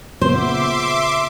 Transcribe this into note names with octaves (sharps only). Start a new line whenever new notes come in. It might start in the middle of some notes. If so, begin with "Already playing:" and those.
A#2 C#3 B3 C5 E5 C6 D6